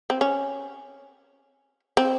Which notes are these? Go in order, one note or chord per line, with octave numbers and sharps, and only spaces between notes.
C4
C#4
C4